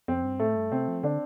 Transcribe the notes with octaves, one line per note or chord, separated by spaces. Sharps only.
F2 C4
G2
A2 A3
G2
C3 C4
F3
D3 D4